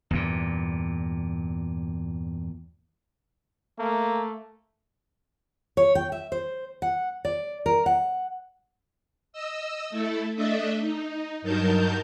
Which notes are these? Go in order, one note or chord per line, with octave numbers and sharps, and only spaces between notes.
E2 G2 A#2
A3 A#3
C#5
G5
E5
C5
F#5
D5
A#4
F#5
D#5 E6
A3 E4 A4
A3 D4 A4 D#5 E5
D#4
G2 F#3 D#4 A#4 A5 G6